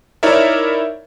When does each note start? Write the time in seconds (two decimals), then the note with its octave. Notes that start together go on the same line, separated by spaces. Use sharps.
0.23 D#4 E4 A#4 C#5 D5 E5